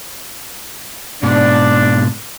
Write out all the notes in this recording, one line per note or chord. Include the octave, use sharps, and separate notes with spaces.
G#2 B2 D4